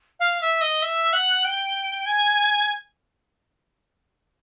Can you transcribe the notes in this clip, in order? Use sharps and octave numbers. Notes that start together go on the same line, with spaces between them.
F5
E5
D#5
E5
F#5
G5
G#5